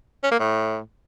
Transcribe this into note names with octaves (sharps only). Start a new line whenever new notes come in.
C#4
A#3
A2